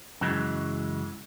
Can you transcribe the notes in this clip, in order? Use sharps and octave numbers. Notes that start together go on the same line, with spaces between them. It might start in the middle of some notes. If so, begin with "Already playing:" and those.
F#2 C#3 E3 F#3 G#3